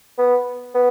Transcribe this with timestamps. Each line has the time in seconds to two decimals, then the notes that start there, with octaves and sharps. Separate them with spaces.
0.18 B3
0.74 B3